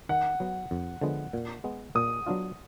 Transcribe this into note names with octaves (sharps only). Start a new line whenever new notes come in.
D#3 F#5
F#3 B3
F2
D3 F3 G#3 B3
A#2
G#3 B3
A#2 D#6
F#3 B3 D4 F4